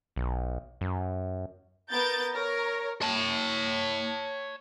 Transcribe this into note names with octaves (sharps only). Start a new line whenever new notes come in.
B1
F#2
B3 A#4 G6 A6
A#4 C#5
C#5 A5